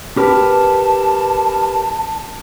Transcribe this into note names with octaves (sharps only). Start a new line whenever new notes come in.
G4 A#4 B4 A5